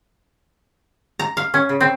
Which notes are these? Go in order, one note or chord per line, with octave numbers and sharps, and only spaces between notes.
A#5
F5
C#4
C#3
C4